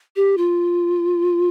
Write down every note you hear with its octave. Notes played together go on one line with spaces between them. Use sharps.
G4
F4